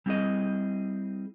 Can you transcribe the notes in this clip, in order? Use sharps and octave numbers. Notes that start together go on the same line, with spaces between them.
G3 C4 E4 F4 G#4 D#5